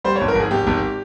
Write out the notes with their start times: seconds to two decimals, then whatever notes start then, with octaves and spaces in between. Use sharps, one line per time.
0.04 G3 C5
0.16 C#5
0.21 G#1
0.28 A#4
0.35 G#1 G#4
0.51 G#1 G4
0.67 G#1